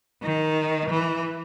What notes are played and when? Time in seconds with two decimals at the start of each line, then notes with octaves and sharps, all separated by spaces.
0.23 D#3
0.90 E3